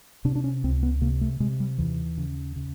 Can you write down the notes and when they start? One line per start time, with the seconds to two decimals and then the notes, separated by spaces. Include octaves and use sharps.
0.25 C3 D4
0.35 D4
0.44 C#4
0.64 C#2 C4
0.83 B3
1.01 C3 A#3
1.21 A3
1.40 C3 G#3
1.60 G3
1.78 D#2 E3
2.18 C#3
2.56 C#3